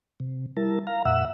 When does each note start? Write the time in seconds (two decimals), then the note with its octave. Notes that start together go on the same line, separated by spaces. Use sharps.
0.20 C3
0.57 G3 E4 A#4 A5
0.87 F5 A#5
1.05 F2 A#2 E5 F#5 E6